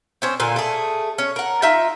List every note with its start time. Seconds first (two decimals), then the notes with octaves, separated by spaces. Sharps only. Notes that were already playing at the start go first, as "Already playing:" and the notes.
0.22 C4 C#4 C5
0.40 A#2 D3 G#5
0.56 A3 G#4
1.18 C#4
1.36 A#4 F#5
1.62 D#4 F4 E5